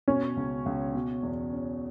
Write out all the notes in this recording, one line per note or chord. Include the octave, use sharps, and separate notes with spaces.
B2 C#4
C#2
C#2
B2
E2
C#4